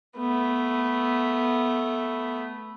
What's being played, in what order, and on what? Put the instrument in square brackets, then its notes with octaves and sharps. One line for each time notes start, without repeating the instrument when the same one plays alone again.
[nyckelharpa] A3 B3